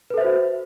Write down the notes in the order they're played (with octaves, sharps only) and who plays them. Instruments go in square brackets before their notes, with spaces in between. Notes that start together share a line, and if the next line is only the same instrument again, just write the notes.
[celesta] B4
A4
E5
C5
F#4